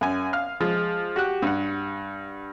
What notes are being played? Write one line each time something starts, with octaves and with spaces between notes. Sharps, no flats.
F#2 G#5
F5 F6
F3 G#3
F#4 G4 F#6
G2 F#5